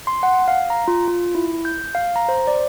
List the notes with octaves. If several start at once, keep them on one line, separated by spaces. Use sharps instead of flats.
C6
F#5
F5
A#5
F4
F4
E4
G6
F5
A#5
C5
D5